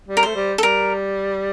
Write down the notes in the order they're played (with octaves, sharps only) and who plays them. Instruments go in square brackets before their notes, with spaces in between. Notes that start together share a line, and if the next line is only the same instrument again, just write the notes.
[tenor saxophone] G3
[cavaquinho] A#4
[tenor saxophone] A3 [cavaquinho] C5
[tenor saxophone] G3
[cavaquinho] A4
[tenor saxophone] G3 [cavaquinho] A#4